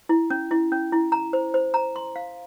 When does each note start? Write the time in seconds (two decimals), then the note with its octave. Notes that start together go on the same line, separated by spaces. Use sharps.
0.09 E4
0.30 C#4
0.51 E4
0.72 C#4
0.92 E4
1.12 A#5
1.33 C5
1.54 C5
1.74 A#5
1.96 C6
2.16 F5